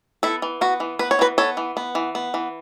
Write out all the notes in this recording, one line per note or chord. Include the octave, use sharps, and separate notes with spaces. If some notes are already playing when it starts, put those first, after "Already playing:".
B3 E4 A4
E3
B3 F#4
E3
B3 B4
C#5
E3 F#4 B4
B3 A4 C#5
E3
B3
E3
B3
E3